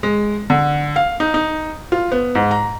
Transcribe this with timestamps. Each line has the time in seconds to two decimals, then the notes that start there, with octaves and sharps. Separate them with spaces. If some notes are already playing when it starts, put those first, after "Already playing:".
0.03 G#3
0.50 D3
0.96 F5
1.20 D#4
1.34 D#4
1.92 F4
2.12 B3
2.35 G#2
2.51 A#5